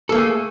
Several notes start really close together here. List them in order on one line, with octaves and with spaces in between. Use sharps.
A4 A#3 A3 G#4